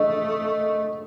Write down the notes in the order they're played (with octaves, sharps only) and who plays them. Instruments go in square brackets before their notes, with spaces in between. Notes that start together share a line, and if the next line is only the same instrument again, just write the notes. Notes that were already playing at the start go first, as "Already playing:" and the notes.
Already playing: [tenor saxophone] A3 [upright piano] D#5